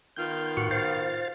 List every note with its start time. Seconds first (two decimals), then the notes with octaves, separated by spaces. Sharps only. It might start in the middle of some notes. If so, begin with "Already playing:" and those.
0.16 D#3 B3 F4 G6
0.57 A2 F#4 F#5
0.71 C5 F5 A6